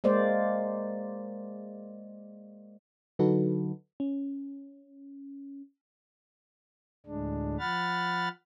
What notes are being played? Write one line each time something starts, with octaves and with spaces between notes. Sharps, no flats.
G#3 A#3 C5 D5
D3 F#3 D#4 F#4 A4 B4
C#4
D2 A2 G#3 D4
F3 F#5 B5 F6 A6